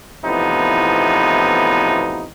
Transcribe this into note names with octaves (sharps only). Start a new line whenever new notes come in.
E2 A2 C3 F3 B3 D#4